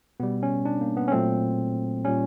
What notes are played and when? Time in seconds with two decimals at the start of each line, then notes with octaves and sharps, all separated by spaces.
0.20 B2 G3 B3
0.43 C#4
0.65 D4
0.81 A#3
0.97 B3
1.08 C#4
1.12 A#2 F#3 A3 C4
2.05 A#2 G3 C#4